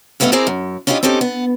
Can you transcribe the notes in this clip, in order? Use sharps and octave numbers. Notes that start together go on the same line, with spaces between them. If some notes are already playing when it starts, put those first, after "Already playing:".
G2 A3 B3 E4 D#5 F5
C4 E4 G#4 A#4 C5 D5
F#2
C#4 D4 E4 F4 G4 D#5
C4 C#4 D#4 G4 A4
B3